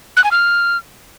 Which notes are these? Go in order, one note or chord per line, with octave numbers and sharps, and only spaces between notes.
F#6
G#5
F6